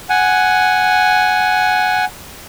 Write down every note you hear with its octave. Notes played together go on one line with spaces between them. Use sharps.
F#5 G#5